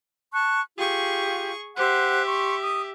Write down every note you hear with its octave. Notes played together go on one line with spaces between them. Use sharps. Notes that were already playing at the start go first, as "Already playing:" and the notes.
A5 C#6 F#6
F4 G4 G#4 C#6
G4 C5 E5 F#5 F#6
C6 C#6
D#6